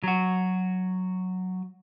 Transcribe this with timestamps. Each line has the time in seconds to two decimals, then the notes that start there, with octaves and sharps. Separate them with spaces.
0.04 F#3 F#4